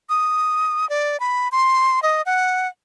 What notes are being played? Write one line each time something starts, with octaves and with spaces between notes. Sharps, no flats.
D#6
D5
B5
C6
D#5
F#5